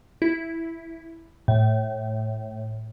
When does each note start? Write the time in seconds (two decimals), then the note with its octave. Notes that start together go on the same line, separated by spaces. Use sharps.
0.22 E4
1.48 A2